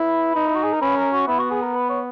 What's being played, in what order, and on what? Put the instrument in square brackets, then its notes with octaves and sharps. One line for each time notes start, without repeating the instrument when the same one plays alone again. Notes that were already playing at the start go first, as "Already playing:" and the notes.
Already playing: [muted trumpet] E4 [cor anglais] B4
[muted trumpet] D#4
[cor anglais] E4
F#4
G#4
A#4
[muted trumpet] C#4 [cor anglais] B4
[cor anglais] A#4
F#4
[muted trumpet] B3 [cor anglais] E4
[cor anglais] F#4
G#4
A#4
B4
C#5